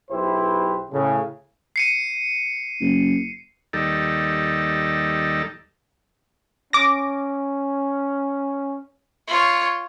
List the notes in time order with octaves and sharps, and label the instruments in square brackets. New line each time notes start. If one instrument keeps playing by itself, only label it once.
[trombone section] B1 E4 G4 B4 C5
A2 C#3
[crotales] C7 C#7 D#7
[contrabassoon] F#1
[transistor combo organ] D#2 G3 D#4 A4
[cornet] C#4 [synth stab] D6 A#6
[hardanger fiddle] F4 C#5